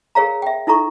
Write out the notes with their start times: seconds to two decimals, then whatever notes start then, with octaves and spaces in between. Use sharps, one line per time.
0.15 G#4 A#4 C#5 F5 A#5
0.42 E5 G5
0.67 D#4 E4 A4 A#5 C#6